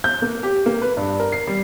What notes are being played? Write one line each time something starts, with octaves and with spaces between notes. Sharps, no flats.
G6
A#3
G4
A#3
B4
G2
A#4
C7
G3